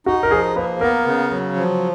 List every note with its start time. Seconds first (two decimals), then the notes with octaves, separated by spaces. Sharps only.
0.06 D#4 F#4
0.23 A#4
0.31 F3 G#4
0.56 A#3 B4
0.81 B3 A#4
1.06 C#3
1.31 F#3
1.56 F3